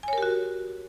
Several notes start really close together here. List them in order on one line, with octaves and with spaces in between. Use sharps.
G#5 C#5 A#4 G4 F#4